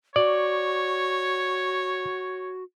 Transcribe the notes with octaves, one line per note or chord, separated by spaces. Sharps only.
F#4 C#5 D5